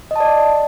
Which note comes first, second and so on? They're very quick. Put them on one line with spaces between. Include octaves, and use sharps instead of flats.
D#5 A5 D5